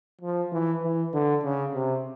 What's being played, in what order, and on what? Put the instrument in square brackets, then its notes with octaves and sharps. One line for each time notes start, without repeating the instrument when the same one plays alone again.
[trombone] F3
E3
E3
D3
C#3
C3